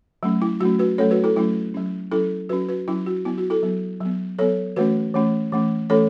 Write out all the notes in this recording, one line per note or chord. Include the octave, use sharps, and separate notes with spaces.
F#3 A3 C#4
E4
F#3 A3 C#4 F#4
F#4 B4
F#3 A3 C#4 A4 C#5
F#4 B4
E4 A4
F#3 A3 C#4 E4
F#3 C#4
F#3 C#4 E4 A4
F#3 C#4 F#4 B4
F#4 B4
F#3 C#4 E4
F#4
F#3 B3 E4
F#4
E4 A4
F#3 B3
F#3 B3
F#3 B3 A4 C#5
E3 A3 C#4 F#4 B4
E3 A3 C#4
E3 A3 C#4
E3 A3 C#4 A4 C#5